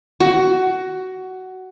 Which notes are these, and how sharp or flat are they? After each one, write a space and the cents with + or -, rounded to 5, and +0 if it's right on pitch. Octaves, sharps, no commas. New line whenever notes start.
F#4 +15